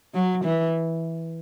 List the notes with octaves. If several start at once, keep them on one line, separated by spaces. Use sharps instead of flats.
F#3
E3